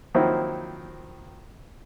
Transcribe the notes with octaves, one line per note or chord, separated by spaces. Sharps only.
D#3 F3 F#3 A#3 C4 E4